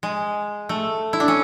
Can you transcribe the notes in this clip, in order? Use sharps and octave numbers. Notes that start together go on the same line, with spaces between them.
G#3
A3
E4
D4
C#4